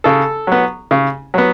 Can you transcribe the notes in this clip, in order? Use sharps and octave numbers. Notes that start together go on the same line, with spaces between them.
C#3 A4
F#3 B3
C#3
F#3 B3